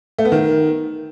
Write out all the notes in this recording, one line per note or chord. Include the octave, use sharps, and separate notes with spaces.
A3
B3
D#3